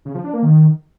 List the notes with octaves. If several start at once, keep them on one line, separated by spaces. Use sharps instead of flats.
C#3
F3
D4
A#3
D#3